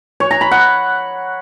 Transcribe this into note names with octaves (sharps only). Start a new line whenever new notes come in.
C#5
A#5
B5
F#5